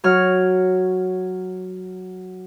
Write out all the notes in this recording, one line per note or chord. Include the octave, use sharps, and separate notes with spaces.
F#3 C#5 F6